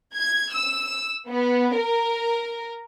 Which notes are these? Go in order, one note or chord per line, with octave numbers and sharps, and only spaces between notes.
G#6
E6
B3
A#4